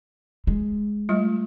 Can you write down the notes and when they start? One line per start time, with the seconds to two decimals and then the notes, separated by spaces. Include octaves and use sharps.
0.47 G#3
1.09 G3 A3 F4